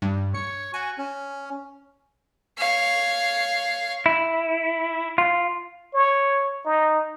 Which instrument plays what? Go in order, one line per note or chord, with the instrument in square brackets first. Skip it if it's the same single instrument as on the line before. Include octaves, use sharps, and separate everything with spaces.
[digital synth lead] G2
[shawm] C#5 [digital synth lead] C#7
[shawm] F#4 [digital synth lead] G#5
[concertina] C#4
[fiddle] C#5 F5
[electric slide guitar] E4
F4
[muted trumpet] C#5
D#4